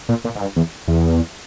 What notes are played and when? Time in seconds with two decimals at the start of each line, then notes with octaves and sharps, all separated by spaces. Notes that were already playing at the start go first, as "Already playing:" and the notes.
0.09 A#2
0.25 A#2
0.36 G#2
0.41 G2
0.56 E2
0.88 E2